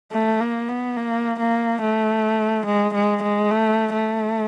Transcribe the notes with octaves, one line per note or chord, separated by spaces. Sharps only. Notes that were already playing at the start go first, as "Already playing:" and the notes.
A3
A#3
B3
A#3
A#3
A3
G#3
G#3
G#3
A3
A3